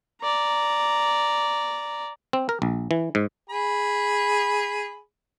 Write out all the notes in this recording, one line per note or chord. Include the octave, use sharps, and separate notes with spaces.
D5 A#5
C4
A#4
A#1
E3
G#2
G#4 B5